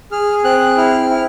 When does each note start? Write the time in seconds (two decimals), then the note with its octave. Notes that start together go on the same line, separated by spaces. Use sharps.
0.11 G#4 F6
0.44 C4 F#6
0.77 E4 F6
1.10 E4